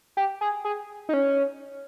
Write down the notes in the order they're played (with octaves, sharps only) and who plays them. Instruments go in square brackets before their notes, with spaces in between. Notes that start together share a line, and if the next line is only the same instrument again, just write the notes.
[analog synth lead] G4
G#4
G#4
D#4
C#4